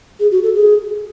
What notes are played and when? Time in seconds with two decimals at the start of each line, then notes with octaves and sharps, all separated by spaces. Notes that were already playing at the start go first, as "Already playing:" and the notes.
0.19 G#4
0.31 F#4
0.43 A4
0.54 G#4